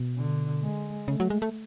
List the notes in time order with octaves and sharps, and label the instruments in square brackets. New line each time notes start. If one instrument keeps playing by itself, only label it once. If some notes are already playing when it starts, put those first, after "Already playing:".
Already playing: [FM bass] B2
[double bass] D3
G#3
[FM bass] C#3 [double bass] A3
[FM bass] F#3
G#3
A3